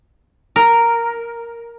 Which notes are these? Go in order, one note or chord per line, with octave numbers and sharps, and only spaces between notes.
A#4